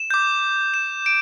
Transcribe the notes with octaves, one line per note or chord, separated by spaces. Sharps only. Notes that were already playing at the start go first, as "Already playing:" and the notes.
Already playing: E7
D6 G6
E7
D7